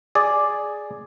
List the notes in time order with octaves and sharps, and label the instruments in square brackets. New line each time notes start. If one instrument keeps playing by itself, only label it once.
[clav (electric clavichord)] G#4 D5